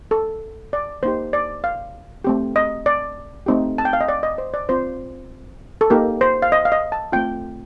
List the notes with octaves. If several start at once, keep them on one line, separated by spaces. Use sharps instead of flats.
A4
D5
A#3 D#4 G4 C5
D5
F5
A3 C4 G4
D#5
D5
A3 C4 D#4 G4
A5
G5
F5
D#5
D5
D#5
C5
D5
C4 F4 C5
A4
A#3 D#4 G4 A#4
C5
F5
D#5
F5
D#5
A5
A3 C4 F4 G5